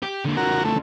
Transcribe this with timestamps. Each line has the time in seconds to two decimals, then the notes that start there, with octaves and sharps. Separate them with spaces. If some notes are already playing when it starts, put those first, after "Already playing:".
0.02 G4
0.25 D3 A#3
0.37 D3 F3 F#4 A#4
0.65 A3